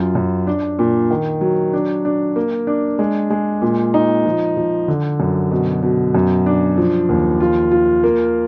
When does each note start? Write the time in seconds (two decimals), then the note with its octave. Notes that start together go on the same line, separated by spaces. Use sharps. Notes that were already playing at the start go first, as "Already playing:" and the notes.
Already playing: F#2 F4
0.15 F#2
0.47 D4
0.79 A#2
1.11 D#3
1.41 F#3
1.73 D4
2.05 D4
2.36 A#3
2.67 D4
2.99 G#3
3.30 G#3
3.62 A#2
3.94 D#4
4.26 F3
4.57 F3
4.88 D3
5.20 F#2
5.51 B2
5.83 B2
6.15 F#2
6.46 D4
6.78 F3
7.09 D#2
7.40 F4
7.72 F4
8.04 A#3